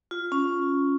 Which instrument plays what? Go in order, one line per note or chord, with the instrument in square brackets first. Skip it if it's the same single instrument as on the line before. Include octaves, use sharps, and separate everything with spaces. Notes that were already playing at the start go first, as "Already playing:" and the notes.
[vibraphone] F4
C#4